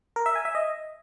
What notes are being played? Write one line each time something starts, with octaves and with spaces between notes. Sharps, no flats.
A#4
E5
G#5
E5
D#5